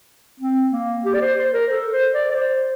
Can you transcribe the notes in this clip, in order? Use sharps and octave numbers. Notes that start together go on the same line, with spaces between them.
C4
A#3
G4
D5
C5
C5
A#4
A4
C5
D5
D5
C5